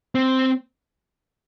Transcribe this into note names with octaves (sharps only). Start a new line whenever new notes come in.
C4